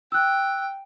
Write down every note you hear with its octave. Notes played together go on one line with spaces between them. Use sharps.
G5 E6 F#6